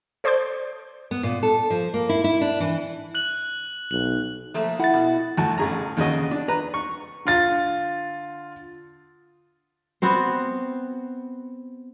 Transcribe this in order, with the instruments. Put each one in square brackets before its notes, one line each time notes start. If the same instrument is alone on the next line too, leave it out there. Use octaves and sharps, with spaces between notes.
[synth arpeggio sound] A4 C5 D5 C6 D6 G6
[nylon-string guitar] B3
A#2
A4
F3
A#3
E4
E4
D4
E3
[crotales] F#6 F#7
[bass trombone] B1 [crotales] F#7
[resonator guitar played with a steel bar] F3 A3 A#3
[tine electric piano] E4 A6 [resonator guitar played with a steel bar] F#5
[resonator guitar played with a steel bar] B2 F#4
[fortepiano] D2 F#4 A5
A1 G#4 A#5
D#2 C#3 F#4 D#5
D4
B4 A#5
C#6
[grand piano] D3 F4 A6
[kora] B3 C4 F#4 C5